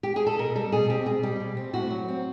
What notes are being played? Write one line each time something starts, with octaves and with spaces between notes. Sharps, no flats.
G4
G#4
A4
B2 A#4
G3 A4
B2 G#4
C4 G4
B2 G#4
G3 G4
B2
C4
A2 F#4
F#3
C4